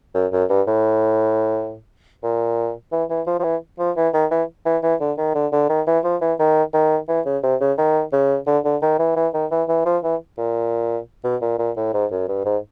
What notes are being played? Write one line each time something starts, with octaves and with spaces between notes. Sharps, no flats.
F#2
F#2
G2
A2
A#2
E3
E3
F3
F3
E3
F3
E3
D#3
E3
E3
E3
D3
D#3
D3
D3
D#3
E3
F3
E3
D#3
D#3
E3
C#3
C3
C#3
D#3
C#3
D3
D3
D#3
E3
E3
D#3
E3
E3
F3
E3
A#2
B2
A#2
A#2
A2
G#2
F#2
G2
G#2